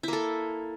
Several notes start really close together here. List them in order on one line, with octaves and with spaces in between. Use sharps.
E4 A#3 A4